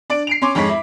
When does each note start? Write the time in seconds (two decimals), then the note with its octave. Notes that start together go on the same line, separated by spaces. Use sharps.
0.10 D4 D5 D7
0.27 C7 D7 F7
0.42 C#4 C#5 C6 D6
0.55 F2 G#2 G#3 C#5 B6
0.69 E4